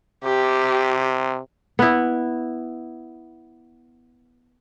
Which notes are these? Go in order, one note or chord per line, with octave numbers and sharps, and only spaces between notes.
C3 G4
B3 E4